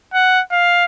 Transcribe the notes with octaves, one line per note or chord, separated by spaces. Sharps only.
F#5
F5